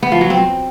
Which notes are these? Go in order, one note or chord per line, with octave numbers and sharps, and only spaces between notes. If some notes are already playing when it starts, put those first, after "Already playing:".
B3
F3
F#3
C4